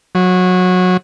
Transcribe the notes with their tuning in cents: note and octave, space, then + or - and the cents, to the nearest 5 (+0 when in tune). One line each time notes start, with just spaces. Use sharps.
F#3 -20